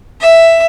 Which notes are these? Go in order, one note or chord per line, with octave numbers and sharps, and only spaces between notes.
E5